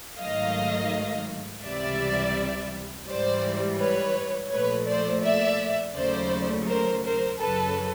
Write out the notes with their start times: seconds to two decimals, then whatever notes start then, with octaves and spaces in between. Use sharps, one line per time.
0.19 G#2 D#3 F#3 A3 D#5 F5
1.63 C#2 C3 E3 G3 D5 E5
3.07 G#2 E3 G3 C5 D5
3.79 B4 C#5
4.51 A#2 F3 A3 B4 C#5
4.87 C5 D5
5.23 D5 E5
5.95 D#2 C#3 F#3 A3 C5 D5
6.67 A#4 C5
7.03 A#4 C5
7.39 F#2 C#3 F#3 A4 B4